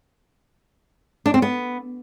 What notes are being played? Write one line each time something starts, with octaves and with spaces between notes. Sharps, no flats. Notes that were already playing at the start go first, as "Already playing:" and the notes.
D4
C4
B3